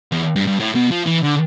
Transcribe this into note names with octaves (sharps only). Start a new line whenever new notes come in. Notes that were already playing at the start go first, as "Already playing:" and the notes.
E2
G2
G2
A2
B2
F3
E3
D3